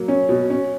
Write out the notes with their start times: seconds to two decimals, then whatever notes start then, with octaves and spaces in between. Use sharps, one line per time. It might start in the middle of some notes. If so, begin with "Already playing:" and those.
Already playing: F#3 A#3
0.08 C#4
0.29 B2
0.50 C#4